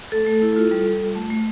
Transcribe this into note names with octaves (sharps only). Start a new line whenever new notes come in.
A3 A4
A3
E4
F4
G3
G3
F4
A3
A3